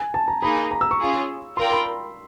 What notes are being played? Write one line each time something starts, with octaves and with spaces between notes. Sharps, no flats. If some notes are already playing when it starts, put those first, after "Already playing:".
Already playing: G#5
A5
A#5
A#3 D#4 G#4 B5
A#5
E6
C#6
C#4 F4 G#4
F4 A#4 D5 G5 C6
B5